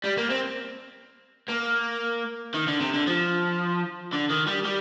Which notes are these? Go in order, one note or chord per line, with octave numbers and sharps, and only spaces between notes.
G3
A#3
C4
A#3
D#3
D3
C3
D3
F3
D3
D#3
G3
G3